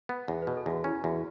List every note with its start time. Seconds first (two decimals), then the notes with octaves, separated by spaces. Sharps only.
0.09 B3
0.28 E2 F#5
0.42 B4
0.47 B2
0.57 A4
0.66 E2 F#4
0.84 C#4 E4
1.04 E2 F#4